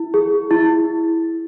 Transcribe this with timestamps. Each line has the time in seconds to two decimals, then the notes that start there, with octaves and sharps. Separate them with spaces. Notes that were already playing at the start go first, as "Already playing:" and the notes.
Already playing: E4
0.14 G#4
0.51 E4